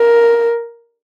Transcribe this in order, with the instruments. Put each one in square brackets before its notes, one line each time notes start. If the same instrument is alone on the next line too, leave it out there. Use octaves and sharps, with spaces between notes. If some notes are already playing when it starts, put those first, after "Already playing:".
Already playing: [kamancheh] A#4